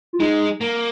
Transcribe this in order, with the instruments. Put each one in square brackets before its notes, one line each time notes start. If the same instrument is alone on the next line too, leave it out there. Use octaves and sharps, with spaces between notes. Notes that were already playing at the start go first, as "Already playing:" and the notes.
[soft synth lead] F4
[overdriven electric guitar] G#3 [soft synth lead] D#4
[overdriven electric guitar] A#3